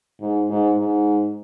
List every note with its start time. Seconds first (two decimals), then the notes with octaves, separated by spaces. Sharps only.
0.21 G#2
0.50 G#2
0.78 G#2